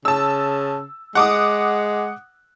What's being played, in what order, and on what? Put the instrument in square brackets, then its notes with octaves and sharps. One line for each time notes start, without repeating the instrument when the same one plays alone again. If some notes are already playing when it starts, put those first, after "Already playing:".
[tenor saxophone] C#3 [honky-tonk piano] A5 E6
[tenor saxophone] G#3 [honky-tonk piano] F#5 D6 D#6